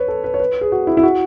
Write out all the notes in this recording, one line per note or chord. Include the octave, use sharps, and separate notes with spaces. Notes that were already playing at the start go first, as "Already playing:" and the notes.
Already playing: B4 C#5
A4
B4
C#5
B4
G#4
F#4
E4
E4
F#4